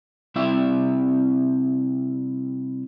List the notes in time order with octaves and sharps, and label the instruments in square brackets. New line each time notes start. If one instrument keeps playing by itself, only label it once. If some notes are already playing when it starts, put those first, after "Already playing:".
[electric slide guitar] C3 G3 C4 E4 E5